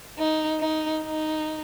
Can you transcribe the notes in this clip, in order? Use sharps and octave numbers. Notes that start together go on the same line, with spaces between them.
D#4
D#4
D#4